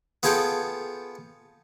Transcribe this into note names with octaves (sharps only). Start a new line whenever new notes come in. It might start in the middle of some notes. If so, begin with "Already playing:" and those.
B3 F4 G#4 A4 G5